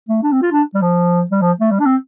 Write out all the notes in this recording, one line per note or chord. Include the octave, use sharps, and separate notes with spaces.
A3
D4
C4
F4
D4
G3
F3
G3
F3
A3
G3
D4
C4